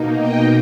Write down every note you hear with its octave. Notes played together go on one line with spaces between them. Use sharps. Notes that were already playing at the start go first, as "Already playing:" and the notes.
Already playing: B2 A#3 D#4
D#5 G5